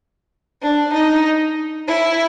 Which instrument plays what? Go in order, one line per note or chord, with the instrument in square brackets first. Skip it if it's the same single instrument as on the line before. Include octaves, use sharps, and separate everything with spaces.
[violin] D4
D#4
E4